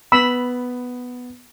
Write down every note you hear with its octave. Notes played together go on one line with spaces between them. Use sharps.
B3 B5 E6